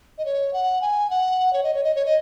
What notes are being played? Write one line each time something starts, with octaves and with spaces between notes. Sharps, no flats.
D#5
C#5
F#5
G#5
F#5
C#5
D#5
C#5
D#5
C#5
D#5